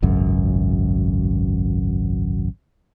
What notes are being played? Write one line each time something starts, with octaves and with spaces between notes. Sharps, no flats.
G#1 C#2 F#2